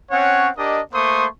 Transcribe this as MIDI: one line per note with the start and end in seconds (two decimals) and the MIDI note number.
0.11 0.48 60
0.11 0.48 61
0.11 0.48 73
0.11 0.48 78
0.57 0.80 62
0.57 0.80 67
0.57 0.80 70
0.57 0.80 75
0.94 1.26 57
0.94 1.26 58
0.94 1.26 72
0.94 1.26 84
0.94 1.26 85
0.94 1.26 87